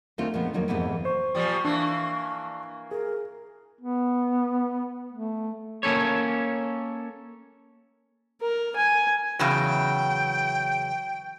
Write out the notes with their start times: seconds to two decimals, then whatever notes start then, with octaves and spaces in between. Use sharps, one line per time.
0.18 D2 D#3 A3 C4 F4
0.34 A#2 F3 G#3 B3
0.54 F2 D#3 F#3 A#3
0.68 F2 G#2 C3 E3 A#3 B3
1.05 C5 C#6
1.35 A#2 F3 G3
1.65 E3 A#3 D4
2.91 G#4 A#4
3.81 B3
5.12 A3
5.83 A#3 C#4 A4 C#5
8.42 A#4
8.76 G#5
9.39 E2 C#3 F#3 G5